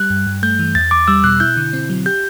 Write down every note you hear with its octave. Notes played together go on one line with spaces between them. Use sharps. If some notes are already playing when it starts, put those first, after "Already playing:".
Already playing: G3 F#6
G2
G2
A3 G6
E3
E2 A6
E2 D6
G3 E6
B2 F#6
E4 G6
D3
C4
F#3
G4 G6